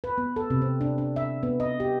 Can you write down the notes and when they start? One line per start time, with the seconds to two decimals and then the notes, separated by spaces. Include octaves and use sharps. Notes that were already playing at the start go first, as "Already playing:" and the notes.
0.04 B4
0.18 B3
0.36 A4
0.50 C3
0.62 C4
0.81 D4
0.98 D4
1.16 E5
1.43 B3
1.60 D#5
1.80 G4